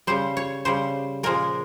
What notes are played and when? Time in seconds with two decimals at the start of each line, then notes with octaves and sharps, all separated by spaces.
0.07 C#3 G3 C5
0.37 C#5
0.65 C#3 G3 C5
1.23 A#2 F3 G#3 A#4